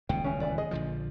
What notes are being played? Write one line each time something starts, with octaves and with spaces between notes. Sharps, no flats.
D#1 C#2 B2 G5
E3 C#4
E3 A#3 D5
G#4 D#5
A#1 D3 F3